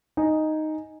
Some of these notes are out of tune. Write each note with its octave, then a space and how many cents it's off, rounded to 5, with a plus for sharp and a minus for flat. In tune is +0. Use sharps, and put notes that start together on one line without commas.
D#4 +0 G#5 +0